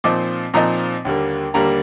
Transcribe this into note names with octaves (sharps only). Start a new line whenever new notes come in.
A#2 F3 C4 D#4 D6
A#2 F3 C4 D#4 A#5
D#2 D3 G3 A#3
D#2 D3 G3 A#3 A#5